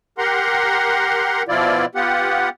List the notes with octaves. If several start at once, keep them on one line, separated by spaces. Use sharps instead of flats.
G4 A#4 F#5 A#5 C6
B2 F3 E4 F4 D5
B3 F4 G4 F#5